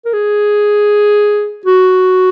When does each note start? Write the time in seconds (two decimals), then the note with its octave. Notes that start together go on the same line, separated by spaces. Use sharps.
0.05 A#4
0.13 G#4
1.66 F#4